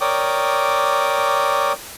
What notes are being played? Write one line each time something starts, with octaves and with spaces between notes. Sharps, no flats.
A#4 C#5 D5 G5 D6 D#6